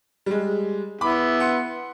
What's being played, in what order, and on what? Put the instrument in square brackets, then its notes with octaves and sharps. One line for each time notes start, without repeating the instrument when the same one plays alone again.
[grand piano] G3 G#3
[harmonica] B3 E4 [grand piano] B5 D6
[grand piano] F#5 C6 C#7